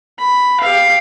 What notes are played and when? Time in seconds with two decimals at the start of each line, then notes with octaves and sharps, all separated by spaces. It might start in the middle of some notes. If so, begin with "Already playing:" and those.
0.19 B5
0.61 G4 F5